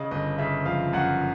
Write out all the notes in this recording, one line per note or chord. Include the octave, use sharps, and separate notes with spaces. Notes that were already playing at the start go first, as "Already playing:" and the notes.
Already playing: C#3 D#5
G1 D#5
C#3 E5
F3 F5
F#2 F#5